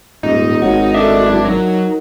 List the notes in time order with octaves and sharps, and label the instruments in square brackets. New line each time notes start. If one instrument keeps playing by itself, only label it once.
[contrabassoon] D#1 [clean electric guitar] G#2 [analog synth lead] D#4
[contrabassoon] G#1 [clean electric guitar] F#4 [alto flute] C#5
[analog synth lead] D4 [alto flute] F#4 [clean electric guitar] A4 D#5 E5
[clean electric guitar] F#2 E4
[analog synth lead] F#3 [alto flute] D#4 [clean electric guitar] A#4